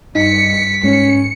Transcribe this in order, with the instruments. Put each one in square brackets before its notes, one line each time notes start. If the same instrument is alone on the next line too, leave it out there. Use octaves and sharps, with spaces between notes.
[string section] G2 C#7 [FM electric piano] D#4 [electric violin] B6
[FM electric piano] G#2 [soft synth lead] C#4 [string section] C#7